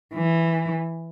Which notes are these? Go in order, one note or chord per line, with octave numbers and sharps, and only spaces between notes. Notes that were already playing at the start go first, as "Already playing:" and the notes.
E3